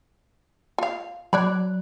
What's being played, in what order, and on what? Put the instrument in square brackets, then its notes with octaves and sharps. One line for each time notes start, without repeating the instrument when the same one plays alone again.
[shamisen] F4 F5
[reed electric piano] F#3 F#6 [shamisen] C#5 D5 B5